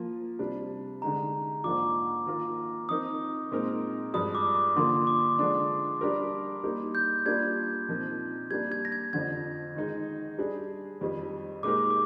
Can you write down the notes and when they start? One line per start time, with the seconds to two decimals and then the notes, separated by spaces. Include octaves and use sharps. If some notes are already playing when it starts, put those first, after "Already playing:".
Already playing: F3 A#3 F4
0.39 C3 G3 D4
1.02 D3 G#3 D#4 A#5
1.64 G#2 F3 A#3 D4 F4 D6
2.26 D#3 A#3 F4 A#4
2.89 F3 C4 D#4 A#4 D#6
3.51 A#2 G#3 C4 D#4 A#4
4.14 G2 F3 G#3 D#6
4.35 D6
4.55 D6
4.76 D3 F3 A#3 F4 C6
5.07 D6
5.39 D3 F3 G#3 D4
6.01 G3 D4 G4 A#4
6.64 G3 A#3 D#4
6.95 G6
7.26 G3 A#3 D4 F4 G#6
7.89 A#2 F3 C4 D#4 A#4
8.51 G3 A#3 D4 G4 G#6
8.72 G#6
8.85 A#6
8.92 G#6
9.13 F2 D3 F3 G#6
9.75 D#3 G#3 D#4 G#4
10.39 G3 D4 G#4
11.01 F2 D#3 G3
11.63 A#2 G#3 D#4 G4 A#4 D6
11.90 D6